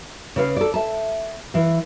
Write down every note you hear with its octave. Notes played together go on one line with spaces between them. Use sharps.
C#3 B4 F5
A4 D5
E5 A5
E3 F5